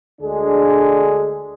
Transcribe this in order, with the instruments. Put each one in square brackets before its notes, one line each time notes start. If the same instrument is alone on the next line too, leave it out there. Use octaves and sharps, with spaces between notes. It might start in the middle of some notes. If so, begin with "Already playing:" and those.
[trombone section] D2 D3 G#3 D4 G#4